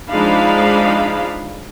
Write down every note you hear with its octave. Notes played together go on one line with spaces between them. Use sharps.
F3 G#3 D4 D#4 F5 B5